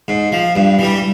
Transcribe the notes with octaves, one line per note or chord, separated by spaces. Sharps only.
G#2
F3
G2
E3 G3